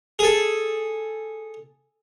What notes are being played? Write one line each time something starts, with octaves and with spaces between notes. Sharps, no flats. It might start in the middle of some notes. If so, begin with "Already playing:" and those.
G#4 A4